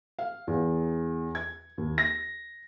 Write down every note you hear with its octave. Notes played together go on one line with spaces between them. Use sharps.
F5
E2
G#6
D#2
A#6